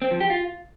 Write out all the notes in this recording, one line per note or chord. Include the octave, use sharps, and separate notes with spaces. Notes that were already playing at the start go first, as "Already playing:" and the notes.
C4
F3
G4
F4